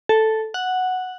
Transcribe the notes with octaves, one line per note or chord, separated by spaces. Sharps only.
A4
F#5